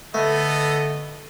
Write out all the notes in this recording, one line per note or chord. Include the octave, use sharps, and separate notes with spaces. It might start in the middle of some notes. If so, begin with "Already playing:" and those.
D3 A3 B3 A4 D#5